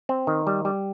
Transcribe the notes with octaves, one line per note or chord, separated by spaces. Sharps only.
C4
D#3
G3
G3